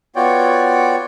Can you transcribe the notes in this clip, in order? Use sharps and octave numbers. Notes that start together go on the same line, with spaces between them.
B3 F4 F#4 C#5 D5 G5